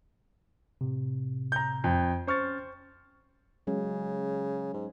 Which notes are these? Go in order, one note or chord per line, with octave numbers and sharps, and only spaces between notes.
A2 C3
A#5 G6
F2
C#4 C5 C#6 F6 A6
C#3 F#3 G#3 C#4
G#2